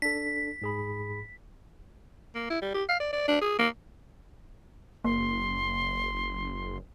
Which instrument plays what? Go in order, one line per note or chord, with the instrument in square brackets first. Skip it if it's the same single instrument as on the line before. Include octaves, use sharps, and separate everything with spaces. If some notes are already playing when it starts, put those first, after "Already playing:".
[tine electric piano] D4 A4 [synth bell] B6
[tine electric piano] G#2 G#4 B5
[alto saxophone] A#3
E4
G3
G4
F5
D5
D5
D4
G#4
A#3
[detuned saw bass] F#1 [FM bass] A#3 [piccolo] C6